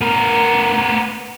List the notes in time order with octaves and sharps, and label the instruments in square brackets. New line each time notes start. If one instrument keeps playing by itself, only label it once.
[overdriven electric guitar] B3 A#4